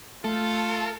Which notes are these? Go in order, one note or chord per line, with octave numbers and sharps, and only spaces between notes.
A3 F4 A4 F5 A5